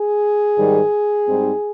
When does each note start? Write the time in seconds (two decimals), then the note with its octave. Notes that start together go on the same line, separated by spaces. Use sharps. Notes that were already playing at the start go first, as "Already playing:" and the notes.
Already playing: G#4
0.56 G#2 D#3 G3
1.27 G#2 G3 C4 D#4